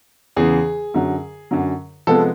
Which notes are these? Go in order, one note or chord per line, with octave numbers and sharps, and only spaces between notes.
E2 C#3 E3 G#4
F#2 D3 F#3
F#2 D3 F#3
C3 F3 G#3 B3 A4